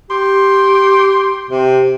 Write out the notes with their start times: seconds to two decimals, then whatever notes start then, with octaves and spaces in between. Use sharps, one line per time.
0.10 G4 C6
1.50 C3